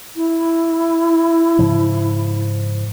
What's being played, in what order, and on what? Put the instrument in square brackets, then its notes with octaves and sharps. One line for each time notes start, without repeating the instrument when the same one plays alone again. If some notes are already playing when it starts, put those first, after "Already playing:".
[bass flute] E4
[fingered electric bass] G#2 C#3 F3